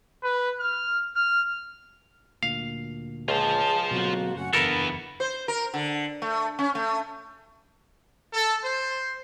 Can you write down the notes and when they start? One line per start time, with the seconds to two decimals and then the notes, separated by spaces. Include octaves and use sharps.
0.23 B4
0.59 F6
1.16 F6
2.43 D2 A#2 F5
3.28 C#2 F4 G#4 C5 A5
3.91 B2 D3 F#3 A#3 C4 F#4
4.35 F#1 A3 C#4 F#5
4.53 F#1 E2 G2 E3 B3 A4 A#4 B5
5.20 C5
5.48 A#4
5.74 D3
6.22 A3
6.59 C#4
6.75 A3
8.34 A4
8.64 C5